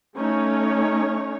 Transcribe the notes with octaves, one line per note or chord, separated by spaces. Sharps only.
A3 C#4 D#4 C#5